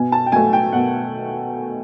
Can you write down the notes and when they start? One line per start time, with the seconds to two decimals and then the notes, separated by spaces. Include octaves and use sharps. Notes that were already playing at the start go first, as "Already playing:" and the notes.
Already playing: B2 G#5
0.12 A5
0.26 G5
0.32 F#3 A3 G#5
0.53 G5
0.72 B2 F#5